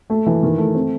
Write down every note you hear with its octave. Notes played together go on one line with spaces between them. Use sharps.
A3
E3
D#3
A3
C4